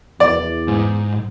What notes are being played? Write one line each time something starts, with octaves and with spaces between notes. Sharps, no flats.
E2 D5
G#2